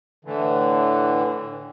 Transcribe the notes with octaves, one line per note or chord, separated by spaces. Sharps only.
A2 D3 E3